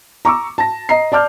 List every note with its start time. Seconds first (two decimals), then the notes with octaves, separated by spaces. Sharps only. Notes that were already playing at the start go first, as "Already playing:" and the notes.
0.25 A#5 C#6 D6 E6
0.58 A5 A#6
0.89 D#5 A#5 C7
1.12 D5 A5 D6 F6 G6